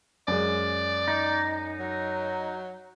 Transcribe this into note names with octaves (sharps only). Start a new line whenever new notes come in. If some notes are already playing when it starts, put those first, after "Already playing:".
F#2 G#3 D5
D#4
F#3